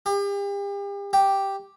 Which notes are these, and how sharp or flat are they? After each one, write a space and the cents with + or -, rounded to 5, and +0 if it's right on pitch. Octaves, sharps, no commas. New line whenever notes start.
G4 +40
G4 +0